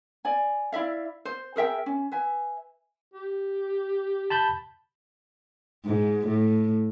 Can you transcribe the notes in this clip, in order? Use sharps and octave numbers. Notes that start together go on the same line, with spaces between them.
D5 G#5
E4 D5 E5 F5
C5
G#4 A#4 E5 G5
C#4
B4 E5 G#5
G4
A5 B5 G6
G#2
A2